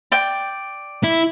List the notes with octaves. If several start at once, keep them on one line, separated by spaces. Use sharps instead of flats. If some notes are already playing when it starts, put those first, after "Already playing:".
D5 G5
E4